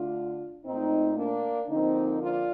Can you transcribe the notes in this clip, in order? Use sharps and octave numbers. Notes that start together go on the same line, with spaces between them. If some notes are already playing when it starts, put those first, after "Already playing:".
Already playing: D3 A3 D4 F4
A#2 A3 C4 D#4
A#3 D4
D3 F3 A#3 C4 D#4
D4 F4